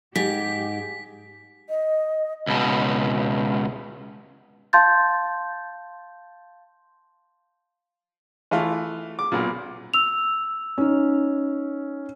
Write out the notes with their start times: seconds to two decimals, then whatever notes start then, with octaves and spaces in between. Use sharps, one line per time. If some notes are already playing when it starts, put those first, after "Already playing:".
0.16 G#2 G4 B6
1.69 D#5
2.47 C#2 B2
4.73 F5 A5 C6 G6 A6
8.51 E3 A3 F4
9.19 D6
9.32 B1 A#2
9.94 E6 F7
10.78 C#4 D#4